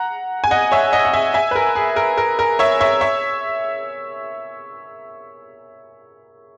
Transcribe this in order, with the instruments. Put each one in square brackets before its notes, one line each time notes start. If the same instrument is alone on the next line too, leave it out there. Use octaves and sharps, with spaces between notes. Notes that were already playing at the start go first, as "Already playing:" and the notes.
Already playing: [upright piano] F#5 A#5
G#5
D#5 F#5
C#5 E5
D#5 F#5
F#5
E5 G#5
E5 G#5
B4
A#4
G#4
A#4
A#4
A#4
C#5 E5
C#5 E5
C#5 E5